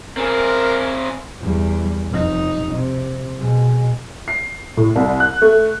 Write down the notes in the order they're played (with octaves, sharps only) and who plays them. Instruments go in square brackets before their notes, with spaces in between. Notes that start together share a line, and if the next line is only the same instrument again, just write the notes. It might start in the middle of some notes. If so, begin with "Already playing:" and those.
[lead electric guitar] C4 G#4 [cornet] A#4
[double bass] E2 G3
F1 D#4
C3
B2 G#3
[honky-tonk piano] C7
A2
C2
F#6
A3